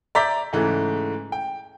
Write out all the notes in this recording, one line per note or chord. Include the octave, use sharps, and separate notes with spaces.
D5 E5 A#5 D6 G6 B6
G#2 C#3 E3 A3
G5